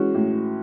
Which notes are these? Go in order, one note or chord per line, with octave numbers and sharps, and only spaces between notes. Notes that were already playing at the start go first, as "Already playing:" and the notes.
Already playing: E3 G#3 C#4 F#4
A2